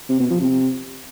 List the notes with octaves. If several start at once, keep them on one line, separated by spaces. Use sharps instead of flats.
C3
B2
F3
C3